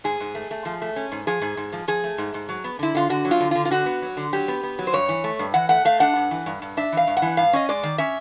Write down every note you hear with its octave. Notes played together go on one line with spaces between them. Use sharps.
G#2 G#4
G#2
A3
A3
F3
A3
C#4
G#2
F3 G#4
G#2
G#2
F3
F3 G#4
A3
G#2
G#2
F#3
B3
D3 E4
D3 F4
D3 F#4
F#3
F4
D3
D3 F4
F4
D3 F#4
B3
F#3
D3
F#3 G4
B3
B3
F#3
C5
G2 C#5
E3
A3
G2
E3 F#5
A3 F#5
A3 F5
D4 F#5
G2
E3
G2
G2
D4 E5
E3 F5
G2
F#5
E3
G2 F5
C#4 D#5
G#3 D5
D#3
C#4 E5